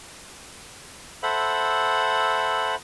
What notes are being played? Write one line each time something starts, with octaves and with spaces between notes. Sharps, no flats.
A4 C5 E5 F#5 B5